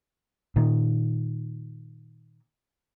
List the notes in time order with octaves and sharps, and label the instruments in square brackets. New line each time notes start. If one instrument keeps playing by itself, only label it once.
[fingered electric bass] A#2 D#3